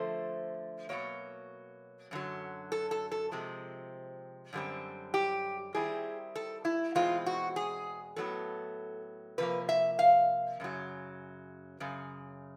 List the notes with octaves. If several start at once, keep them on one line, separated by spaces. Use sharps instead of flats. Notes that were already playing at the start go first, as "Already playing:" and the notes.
Already playing: D3 F3 A3 C5
B2 F#3 A#3 C#5
F#2 D3 F#3
A4
A4
A4
C3 F3 G#3 C4
F#2 D3 G3 C4
G4
D#3 G3 C4 E4 G#4
A4
E4
E2 B2 G#3 C4 F4
F#4
G#4
A2 F#3 B3 A4
C3 F3 A#3 B4
E5
F5
F#2 C#3 F#3
F#2 C#3